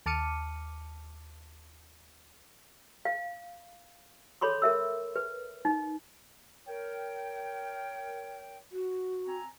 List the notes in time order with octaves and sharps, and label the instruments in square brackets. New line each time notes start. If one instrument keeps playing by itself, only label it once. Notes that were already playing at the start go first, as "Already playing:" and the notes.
[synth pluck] D#2 A5 D6 F6 C#7 D#7
[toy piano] F5
A4 C#5 B5 C6 D6
A#4 E5 E6
B4
D#4
[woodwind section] A#4 C#5 G5
[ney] F#4
[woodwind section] C4 G#5 A#5